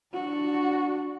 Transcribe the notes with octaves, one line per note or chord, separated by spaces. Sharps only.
D4 F#4